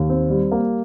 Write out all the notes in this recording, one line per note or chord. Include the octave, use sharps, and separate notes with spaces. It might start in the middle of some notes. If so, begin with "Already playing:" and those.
Already playing: D#2
C4
G3
A#3